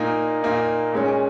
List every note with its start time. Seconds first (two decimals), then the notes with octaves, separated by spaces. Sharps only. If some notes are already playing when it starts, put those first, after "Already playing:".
Already playing: A#2 A#3 D#4
0.42 A#2 A#3 D#4
0.92 A#2 G#3 C#4